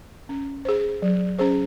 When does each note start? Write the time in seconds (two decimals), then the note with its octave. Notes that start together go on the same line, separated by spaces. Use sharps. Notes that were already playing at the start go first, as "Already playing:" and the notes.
0.29 C#4
0.65 G#4 C5
1.02 F#3
1.39 C#4 G#4 C5